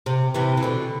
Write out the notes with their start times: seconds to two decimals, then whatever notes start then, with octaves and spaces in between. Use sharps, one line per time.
0.06 C3
0.34 C3 E3
0.57 E3
0.63 B2 D3